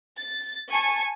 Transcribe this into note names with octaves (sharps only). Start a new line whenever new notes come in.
A6
G#5 A5 C#6